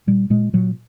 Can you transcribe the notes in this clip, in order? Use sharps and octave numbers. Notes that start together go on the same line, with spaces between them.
A#2 G3
A#2 G#3
A#2 F#3